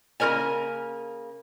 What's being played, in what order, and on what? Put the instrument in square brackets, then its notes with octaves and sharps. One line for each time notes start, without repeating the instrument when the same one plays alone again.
[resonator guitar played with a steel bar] C#3 A#3 F#4 A#4 C#5 G#5